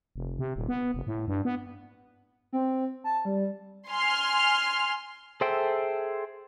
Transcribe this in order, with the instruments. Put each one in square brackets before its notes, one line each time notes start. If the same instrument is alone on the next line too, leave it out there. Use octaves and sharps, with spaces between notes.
[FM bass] F1
C3
D#1
B3
F1
A2
G2
B3
[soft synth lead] C4
A5
G3
[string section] G#5 C6 F6
[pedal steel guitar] G#4 A4 C5 E5 G5